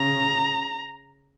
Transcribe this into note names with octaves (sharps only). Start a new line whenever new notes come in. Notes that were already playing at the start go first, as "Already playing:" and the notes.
Already playing: C#3 A#5